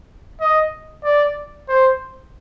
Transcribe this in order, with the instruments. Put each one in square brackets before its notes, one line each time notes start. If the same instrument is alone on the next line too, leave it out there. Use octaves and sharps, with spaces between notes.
[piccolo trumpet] D#5
D5
C5